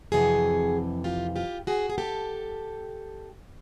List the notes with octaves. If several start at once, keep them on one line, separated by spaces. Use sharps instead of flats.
F2 C3 E3 F#4 G#4
F4 G4
F4 G4
F#4 G#4
G#4
G4 A4